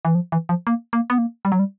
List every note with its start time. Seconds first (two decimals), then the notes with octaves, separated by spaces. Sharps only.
0.05 E3
0.15 F3
0.32 E3
0.49 F3
0.67 A#3
0.93 A#3
1.10 B3
1.18 A#3
1.45 G3
1.52 F#3
1.59 G3